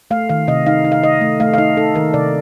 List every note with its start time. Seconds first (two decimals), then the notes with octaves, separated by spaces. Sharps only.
0.11 A3 F5
0.29 D#3 F5
0.47 C3 D#5
0.66 D#4 F5
0.85 D#4
0.92 F5
1.03 D#4 D#5
1.21 A3
1.40 A3 F5
1.54 F5
1.58 D#4 D#5
1.77 D#4 A4
1.95 D#3 A#4
2.13 C3 D5